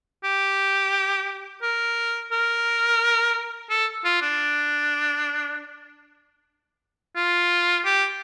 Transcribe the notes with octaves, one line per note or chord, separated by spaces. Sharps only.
G4
A#4
A#4
A4
F4
D4
F4
G4